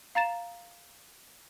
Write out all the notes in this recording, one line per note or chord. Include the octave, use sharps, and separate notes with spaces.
F5 A#5 A6 E7